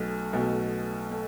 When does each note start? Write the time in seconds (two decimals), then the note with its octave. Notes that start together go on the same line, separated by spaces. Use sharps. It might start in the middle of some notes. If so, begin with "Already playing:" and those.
Already playing: B1 B2 A3
0.33 B1 B2 A3
1.11 A3